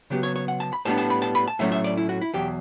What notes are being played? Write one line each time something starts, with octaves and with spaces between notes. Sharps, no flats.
C#3 F#3 B3 G4
C#5
C#5
F#5
A5
B5
A2 G3 B3 D4 A5
A5
B5
A5
B5
A5
A2 F#3 A3 C#4 E5
E5
D5
E4
F#4
E4
E2 B2 F#3 G4